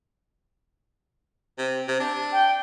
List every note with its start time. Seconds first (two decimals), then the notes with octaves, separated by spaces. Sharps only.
1.58 C3
1.88 C3
2.00 D4
2.32 G5